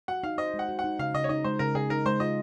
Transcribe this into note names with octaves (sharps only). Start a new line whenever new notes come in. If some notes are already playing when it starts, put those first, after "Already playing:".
F#4 F#5
D#4 F5
C5 D#5
G#3
F#5
F#4
F#5
D#4
C#3 F5
C#3 D#5
C#5
D#4 D#5
G#3 C5
C#3 A#4
C#3 G#4
D#4 A#4
G#3 C5
F4 D#5